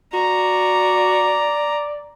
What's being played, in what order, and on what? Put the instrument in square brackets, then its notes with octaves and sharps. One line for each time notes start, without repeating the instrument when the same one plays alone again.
[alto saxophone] F#4 [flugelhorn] D5 [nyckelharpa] A#5